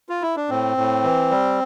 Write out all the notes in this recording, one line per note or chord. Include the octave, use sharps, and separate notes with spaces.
F4
E4
D4
A2 C4
A2
E3
G3